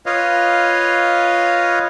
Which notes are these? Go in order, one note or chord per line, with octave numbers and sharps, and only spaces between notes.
F4 B4 C#5 D#5 F5